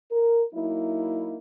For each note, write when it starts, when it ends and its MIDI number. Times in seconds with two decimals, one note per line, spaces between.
0.11 0.43 70
0.54 1.38 54
0.54 1.38 58
0.54 1.38 63
0.54 1.38 64